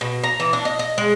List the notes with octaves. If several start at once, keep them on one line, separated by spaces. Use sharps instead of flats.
B2
A#5
E3
D4
D#5
D#5
G#3